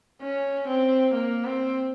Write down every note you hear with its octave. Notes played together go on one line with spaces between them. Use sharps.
C#4
C4
A#3
C4